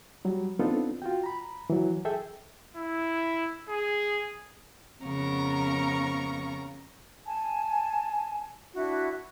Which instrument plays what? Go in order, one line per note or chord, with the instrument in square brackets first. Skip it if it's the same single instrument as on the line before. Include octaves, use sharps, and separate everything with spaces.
[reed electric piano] F#3 G3
B3 C4 D4 D#4 F4 A4
F4 F#4 G5
A#5 B5
E3 F#3
G#4 A4 E5 G5
[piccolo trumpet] E4
G#4
[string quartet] F2 C#3 B3 A#4 A#5 C#6
[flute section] G#5 A5
D4 E4 F#4 E5